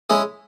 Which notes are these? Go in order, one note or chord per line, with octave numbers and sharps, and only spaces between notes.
G#3 C#4 E4 G#4